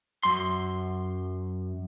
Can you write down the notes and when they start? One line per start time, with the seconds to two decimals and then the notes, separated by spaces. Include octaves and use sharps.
0.23 F#2 C6